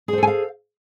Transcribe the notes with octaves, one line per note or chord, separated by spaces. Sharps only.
G#4 A4 C5 F5 G#5